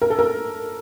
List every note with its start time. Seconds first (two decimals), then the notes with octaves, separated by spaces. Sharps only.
0.02 A#4
0.10 A4
0.19 A#4